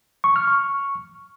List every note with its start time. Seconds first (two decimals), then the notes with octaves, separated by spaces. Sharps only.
0.24 C#6
0.36 F6
0.48 C#6